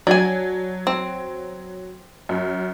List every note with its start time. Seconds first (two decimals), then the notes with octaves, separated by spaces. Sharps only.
0.07 F#3 D4 G#5
0.87 C4
2.29 F#2